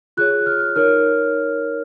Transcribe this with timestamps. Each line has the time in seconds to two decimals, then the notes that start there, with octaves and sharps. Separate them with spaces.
0.17 F4 G#4 C#5 F#6
0.46 F6
0.75 D#4 A#4 C#5 F6